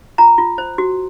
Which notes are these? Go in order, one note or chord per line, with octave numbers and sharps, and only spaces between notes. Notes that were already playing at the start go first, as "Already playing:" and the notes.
F4 A#5
F4
C5
F#4